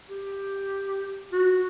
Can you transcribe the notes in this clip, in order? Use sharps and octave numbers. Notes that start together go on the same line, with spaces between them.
G4
F#4